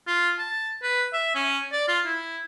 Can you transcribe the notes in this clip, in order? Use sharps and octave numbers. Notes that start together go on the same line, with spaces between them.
F4
A5
B4
E5
C#4
D5
F4
E4